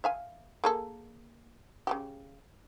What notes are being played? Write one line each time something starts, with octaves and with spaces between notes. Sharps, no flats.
E5 F5 G#5
A#3 G#4 A4
C#3 F#3 G4